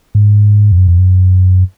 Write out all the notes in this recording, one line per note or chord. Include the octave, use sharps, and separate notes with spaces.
G#2
F2
F#2
F2
F#2